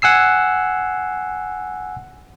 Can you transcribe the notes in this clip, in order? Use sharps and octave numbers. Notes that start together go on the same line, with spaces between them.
F#5 G#5 E6 C7